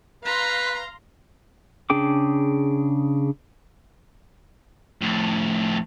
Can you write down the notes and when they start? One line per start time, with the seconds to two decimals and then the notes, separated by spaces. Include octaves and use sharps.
0.24 B4 F5 A#5 C6
1.90 C#3 D4 G#4 G5 D6
5.01 F2 A2